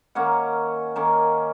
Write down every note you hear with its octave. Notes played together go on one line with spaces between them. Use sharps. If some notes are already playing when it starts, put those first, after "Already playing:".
D#3 A#3 C#4 F#5
D#3 A#3 C#4